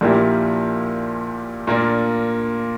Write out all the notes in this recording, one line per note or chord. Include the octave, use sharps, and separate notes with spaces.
A#1 A#2 A#3 E4 G4
A#2 A#3 D4